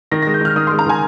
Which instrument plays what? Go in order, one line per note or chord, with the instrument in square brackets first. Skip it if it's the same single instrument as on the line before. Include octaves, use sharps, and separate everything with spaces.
[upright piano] D#3 [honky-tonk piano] A#6
[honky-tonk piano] A#6
[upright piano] G#3
[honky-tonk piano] G6
[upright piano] D#3 [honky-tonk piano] F6
[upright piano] D#3 [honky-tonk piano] D#6
[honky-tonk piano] C6
[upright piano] G#3
[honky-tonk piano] A#5
[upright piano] D#3 [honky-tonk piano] G#5